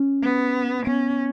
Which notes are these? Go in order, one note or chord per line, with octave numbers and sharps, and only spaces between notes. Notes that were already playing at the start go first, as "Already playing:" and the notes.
Already playing: C#4
B3
B3 C#4